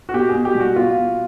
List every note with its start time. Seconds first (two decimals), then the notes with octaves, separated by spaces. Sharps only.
0.09 F#4
0.14 B2 G4
0.29 B2 G#4
0.45 G4
0.55 G3
0.60 F#4
0.76 B2 F4
0.97 B2